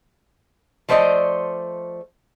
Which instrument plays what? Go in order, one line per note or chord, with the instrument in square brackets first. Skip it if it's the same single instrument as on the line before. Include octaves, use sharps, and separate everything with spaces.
[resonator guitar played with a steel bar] F3 A3 C5 D5 D#5